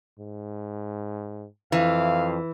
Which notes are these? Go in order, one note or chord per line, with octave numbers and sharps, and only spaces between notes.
G#2
F2 E3 F5